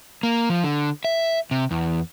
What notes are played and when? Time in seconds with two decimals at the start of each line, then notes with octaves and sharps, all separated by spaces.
0.23 A#3
0.50 F3
0.64 D3
1.05 E5
1.51 C3
1.71 E2